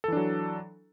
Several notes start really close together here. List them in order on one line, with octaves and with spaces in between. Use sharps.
A4 E3 D4 F#3